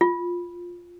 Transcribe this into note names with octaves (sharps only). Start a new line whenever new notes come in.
F4